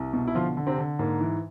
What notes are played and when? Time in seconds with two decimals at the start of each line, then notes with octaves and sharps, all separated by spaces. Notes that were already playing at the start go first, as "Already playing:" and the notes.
Already playing: C2
0.13 B2
0.27 E4
0.35 D3 F3 F4
0.57 D3
0.67 C3 C4
0.78 D3
0.99 G#2 A#3
1.21 E3